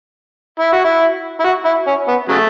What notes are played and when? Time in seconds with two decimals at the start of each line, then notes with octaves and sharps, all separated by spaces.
0.60 E4
0.72 F#4
0.85 E4
1.40 E4
1.45 F#4
1.65 E4
1.87 C#4
2.08 B3
2.29 C#3 F#3 A3